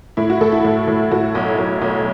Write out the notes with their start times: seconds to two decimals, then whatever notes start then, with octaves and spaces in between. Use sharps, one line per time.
0.17 A2 E4
0.30 F#4
0.41 A2 A4
0.52 E4
0.64 A2
0.88 A2
1.12 A2 F#4
1.35 B1
1.58 B1
1.82 B1